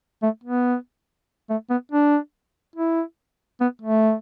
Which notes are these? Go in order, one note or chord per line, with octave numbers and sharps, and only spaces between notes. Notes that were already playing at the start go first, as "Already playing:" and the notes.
A3
B3
A3
B3
D4
E4
B3
A3